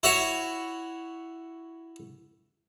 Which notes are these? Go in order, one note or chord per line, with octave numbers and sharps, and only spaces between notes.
E4 F#4 C#5